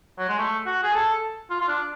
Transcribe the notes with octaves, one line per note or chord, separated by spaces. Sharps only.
F#3
G#3
A3
F#4
G#4
A4
F4
F4
D4